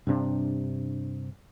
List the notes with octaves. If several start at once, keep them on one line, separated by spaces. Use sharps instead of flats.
G2 C3 D4